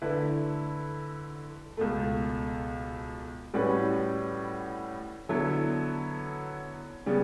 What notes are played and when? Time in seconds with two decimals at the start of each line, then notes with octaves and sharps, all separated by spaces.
0.02 D3 A3 E4 B4
1.77 C#2 B2 A3
3.54 A2 G3 C#4 F#4 B4
5.29 D3 F#3 B3 E4 A4
7.06 C#3 G3 B3